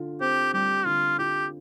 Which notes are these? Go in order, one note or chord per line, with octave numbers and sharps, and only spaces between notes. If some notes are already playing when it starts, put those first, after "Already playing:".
Already playing: D3 F4
C4 G4
G3 G4
D3 F4
F4 G4